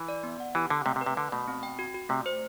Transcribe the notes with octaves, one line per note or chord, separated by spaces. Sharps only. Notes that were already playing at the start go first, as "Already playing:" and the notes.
Already playing: E3
D5
B3
F#5
E3 G4
D3 F#5
C3 A3
C3
B4
C3
D3 A3
B2 A3
C4
G5
F#4
F#4
C3 A3
C5